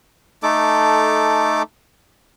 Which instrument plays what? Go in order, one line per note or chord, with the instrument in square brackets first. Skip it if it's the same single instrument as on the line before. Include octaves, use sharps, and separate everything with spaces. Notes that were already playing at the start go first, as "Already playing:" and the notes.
[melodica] A3 D#4 A4 D6